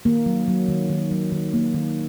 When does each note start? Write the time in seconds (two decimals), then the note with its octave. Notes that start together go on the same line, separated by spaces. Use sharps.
0.05 D#3 A#3
0.26 F#3
0.48 F#3
0.69 D#3
0.89 D#3
1.11 F#3
1.32 D#3
1.53 A#3
1.74 D#3